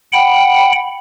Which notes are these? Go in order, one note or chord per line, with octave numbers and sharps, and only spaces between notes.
F#5 G5 B5